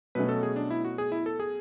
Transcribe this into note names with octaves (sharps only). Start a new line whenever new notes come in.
B2 F#3 A3 C#4 B4
A4
G#4
D4
E4
F#4
G#4
E4
A4
G#4